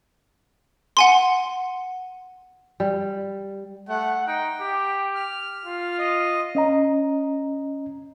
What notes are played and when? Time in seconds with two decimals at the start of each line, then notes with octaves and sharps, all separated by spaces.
0.97 F#5 G#5 C6
2.80 G3
3.89 A3 F#5
4.27 D#4 G5
4.61 G4
5.15 F6
5.65 F4
5.99 D#5
6.55 C#4 D#5 A#5